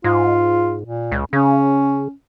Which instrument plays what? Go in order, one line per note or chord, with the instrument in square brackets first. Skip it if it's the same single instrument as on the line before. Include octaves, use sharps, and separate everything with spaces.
[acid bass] G#2 [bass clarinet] F4
[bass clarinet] A#2
[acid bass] C#2
[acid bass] C#3 [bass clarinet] C#4